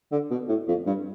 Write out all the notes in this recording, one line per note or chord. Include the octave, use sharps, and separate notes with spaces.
D3
B2
A2
F2
G2